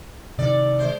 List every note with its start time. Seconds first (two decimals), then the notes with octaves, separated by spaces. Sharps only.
0.38 C3 D#3 A4 D5
0.78 G#3 C5